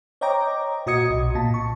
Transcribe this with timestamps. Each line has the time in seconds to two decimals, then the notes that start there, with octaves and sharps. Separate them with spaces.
0.21 C5 C#5 D#5 G5 A#5 D6
0.86 A#2 F#4 D#5 D#6 G#6 C#7
1.10 B1
1.35 A#2 A5
1.54 C#6